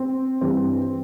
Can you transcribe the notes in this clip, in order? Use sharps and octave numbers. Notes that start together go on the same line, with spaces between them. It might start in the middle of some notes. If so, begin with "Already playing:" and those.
Already playing: C4
G2 E3 C4